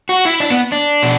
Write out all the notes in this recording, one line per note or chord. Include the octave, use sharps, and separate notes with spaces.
F#4
E4
D4
B3
D4
B2